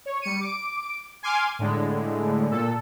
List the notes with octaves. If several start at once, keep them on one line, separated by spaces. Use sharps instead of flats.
C#5
G3 C#7 D#7
D6 D7
G#5 C6 D6 F6
A2 D3 G#3
A#2 A4